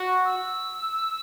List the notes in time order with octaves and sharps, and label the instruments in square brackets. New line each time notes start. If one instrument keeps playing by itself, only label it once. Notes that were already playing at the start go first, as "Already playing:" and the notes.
Already playing: [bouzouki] F#4
[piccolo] E6